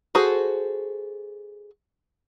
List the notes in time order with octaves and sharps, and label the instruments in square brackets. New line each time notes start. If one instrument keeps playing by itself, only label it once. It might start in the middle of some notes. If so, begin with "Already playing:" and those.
[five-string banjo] F#4 G#4 A4 C5